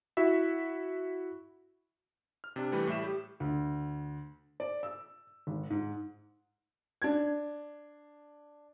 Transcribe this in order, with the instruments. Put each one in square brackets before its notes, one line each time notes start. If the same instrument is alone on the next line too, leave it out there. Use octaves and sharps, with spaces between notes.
[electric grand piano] E4 F#4 E5
F6
C3 D4
E3 G3 A3 B4
A2 G3 E5 E7
G4
[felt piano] D2
D5
E6
G#1
G#2
[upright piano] D4 G#6